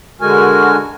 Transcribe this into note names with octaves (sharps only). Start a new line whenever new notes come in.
D3 G#3 F#4 A#4 G#5